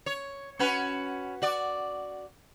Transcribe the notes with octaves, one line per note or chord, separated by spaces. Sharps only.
C#5
C#4 F#4 B4
F#4 D5